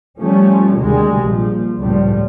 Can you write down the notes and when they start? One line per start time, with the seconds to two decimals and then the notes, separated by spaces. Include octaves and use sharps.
0.20 F3 G3 A3 C#4
0.77 D2 C3 D#3 G3 G#3
1.21 A#1 F3
1.79 C#2 A2 F3 G3